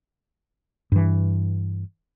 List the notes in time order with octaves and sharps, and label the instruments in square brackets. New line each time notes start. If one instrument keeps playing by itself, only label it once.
[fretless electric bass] G2 E3